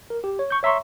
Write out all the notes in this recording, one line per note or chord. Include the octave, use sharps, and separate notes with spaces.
A#4
G4
C#5
C#6 G6
C#5 E5 A#5 C6 C#6